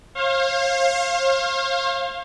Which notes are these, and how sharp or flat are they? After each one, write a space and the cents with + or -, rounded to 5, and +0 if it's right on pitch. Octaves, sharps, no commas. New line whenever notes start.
C5 +45 F5 +0